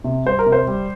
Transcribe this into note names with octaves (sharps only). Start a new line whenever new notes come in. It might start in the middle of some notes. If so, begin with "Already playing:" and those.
C3
G3 C5
A#4
C3
C5
G3